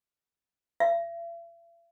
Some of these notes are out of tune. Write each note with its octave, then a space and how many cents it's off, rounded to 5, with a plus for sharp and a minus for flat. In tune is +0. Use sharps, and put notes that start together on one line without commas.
E5 +45